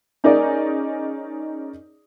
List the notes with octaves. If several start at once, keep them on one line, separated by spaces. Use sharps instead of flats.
C#4 D#4 G#4 A#4 D5 D#5